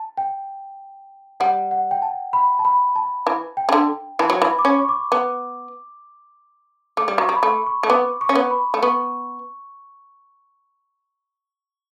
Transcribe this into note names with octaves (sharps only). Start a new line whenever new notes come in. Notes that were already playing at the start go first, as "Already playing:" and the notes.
Already playing: A5
G5
G3 F#5
F#5
G5
A5
B5
A5
B5
A5
E3 A5
G5
C#3
D3
E3 A5
F#3
E3 B5
D6
C#4 C#6
C#6
D6
B3 D6
A3 D6
G3
F#3 C#6
G3
B5
A3 C#6
C#6
A3
B3 D6
C#6
C#4
B3
B5
A3
B3 C#6